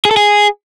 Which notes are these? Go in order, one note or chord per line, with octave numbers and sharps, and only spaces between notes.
G#4
A4
G#4